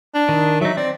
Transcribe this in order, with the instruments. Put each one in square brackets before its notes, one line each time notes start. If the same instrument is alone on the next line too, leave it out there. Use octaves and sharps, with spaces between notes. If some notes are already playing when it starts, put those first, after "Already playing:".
[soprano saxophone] D4
[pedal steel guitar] D#3
[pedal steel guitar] F#3 D#4 [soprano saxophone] E5
[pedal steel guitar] C4 [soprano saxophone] D5